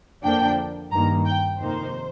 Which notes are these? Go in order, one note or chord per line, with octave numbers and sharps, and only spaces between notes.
F2 D3 F3 A#3 D4 G5
G2 D#3 A#3 A#5
G5
F2 C3 D#3 A#3 D#4 C5